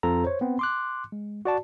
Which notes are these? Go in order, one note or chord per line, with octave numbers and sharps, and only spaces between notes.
F2 C4 F4 A4 A#5
C5 C#5
B3 C4
C6 D6 F#6
G#3
F#4 D5 A5